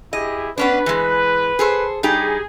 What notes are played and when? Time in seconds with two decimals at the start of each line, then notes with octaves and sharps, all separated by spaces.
0.13 E4 G4 G#4 D#5
0.58 B3 C#4 D4 B4
0.86 E3 G#3
1.59 G#4 A4 C5
2.03 G3 D#4 G4 G#4